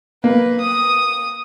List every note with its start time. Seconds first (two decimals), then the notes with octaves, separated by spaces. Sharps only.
0.24 A#3 B4
0.60 D#6